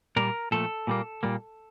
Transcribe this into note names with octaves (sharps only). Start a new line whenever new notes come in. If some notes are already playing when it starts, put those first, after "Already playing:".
A#2 G3 A#3 A#4
A#2 F3 A3 A4
A#2 G3 A#3
A#2 G3 A#3